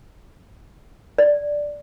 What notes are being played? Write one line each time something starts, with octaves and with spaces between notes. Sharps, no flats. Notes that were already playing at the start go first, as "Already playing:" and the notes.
D5